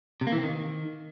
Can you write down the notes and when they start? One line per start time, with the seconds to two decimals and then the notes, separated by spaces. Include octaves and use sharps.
0.21 C3
0.27 A#3
0.32 E3
0.38 C4
0.43 D#3